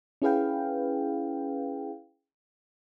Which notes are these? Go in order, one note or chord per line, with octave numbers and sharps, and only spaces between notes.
C#4 E4 G#4 B4 F5 G5